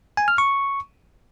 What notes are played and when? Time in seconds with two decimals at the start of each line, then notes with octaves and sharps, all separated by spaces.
0.17 G#5
0.28 F6
0.38 C#6